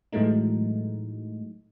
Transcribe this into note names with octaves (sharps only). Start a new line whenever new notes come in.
A2 E3 F#3 G#3 A3 D#4